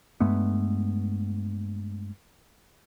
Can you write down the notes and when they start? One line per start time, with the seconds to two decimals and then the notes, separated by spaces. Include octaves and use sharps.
0.20 G2 G#3 A3 B3